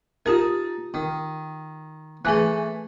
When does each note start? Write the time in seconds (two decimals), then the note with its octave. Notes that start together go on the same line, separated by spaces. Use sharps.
0.26 D#4 F4 G4 A#4 A5
0.94 D#3
2.25 E3 A3 G#4 G#5 F#6